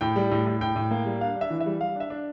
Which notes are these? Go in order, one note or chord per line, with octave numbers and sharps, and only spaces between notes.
A2 G5
G3
A2
A2
A2 G5
A2
A#3
G3
D4 F5
D4
E5
E3
E5
G3
G3 F5
D4 E5
D4